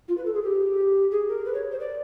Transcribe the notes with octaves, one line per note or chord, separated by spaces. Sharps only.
F4
B4
A4
G#4
G4
G#4
A#4
B4
C#5
C5
D5